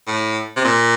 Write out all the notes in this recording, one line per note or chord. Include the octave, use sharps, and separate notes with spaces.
A2
C3
A#2